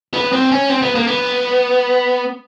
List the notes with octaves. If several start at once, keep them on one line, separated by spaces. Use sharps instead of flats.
B3
C4
C#4
C4
B3
A#3
B3